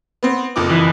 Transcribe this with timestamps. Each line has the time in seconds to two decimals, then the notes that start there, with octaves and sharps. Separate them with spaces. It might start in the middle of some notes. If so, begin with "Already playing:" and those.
0.23 B3 C4
0.56 F#1 F2 D6
0.70 E3